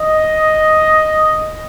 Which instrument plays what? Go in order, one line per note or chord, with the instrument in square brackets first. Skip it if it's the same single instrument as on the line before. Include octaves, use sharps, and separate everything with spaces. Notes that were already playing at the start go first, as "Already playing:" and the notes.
Already playing: [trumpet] D#5